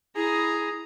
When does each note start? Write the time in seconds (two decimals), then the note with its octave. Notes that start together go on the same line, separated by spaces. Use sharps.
0.16 E4 G#4 A#5 D#6